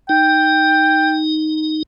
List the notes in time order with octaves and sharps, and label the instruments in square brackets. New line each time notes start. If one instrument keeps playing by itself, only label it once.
[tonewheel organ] D#4 [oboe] G5